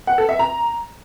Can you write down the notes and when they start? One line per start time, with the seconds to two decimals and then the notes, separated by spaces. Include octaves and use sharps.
0.07 F#5
0.18 A4
0.29 E5
0.39 A#5